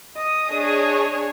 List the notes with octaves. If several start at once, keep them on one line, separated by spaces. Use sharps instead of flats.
D#5 D#6
D4 G#4 C#5